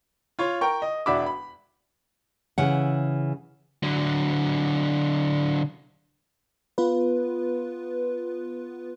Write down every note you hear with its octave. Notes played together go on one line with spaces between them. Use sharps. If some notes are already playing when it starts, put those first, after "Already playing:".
F4 C#5
A#4 G5 C#6
D#5
E1 D4 F#4 E5 B5 D6
B5
C#3 E3 F#5
D3 F#3
B3 F4 B4